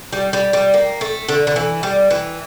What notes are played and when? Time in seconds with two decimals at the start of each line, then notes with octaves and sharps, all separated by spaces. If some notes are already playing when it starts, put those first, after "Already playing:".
0.13 G3
0.33 G3
0.53 G3
0.74 A#3
1.01 A3
1.29 D3
1.47 D3
1.56 E3
1.83 G3
2.11 E3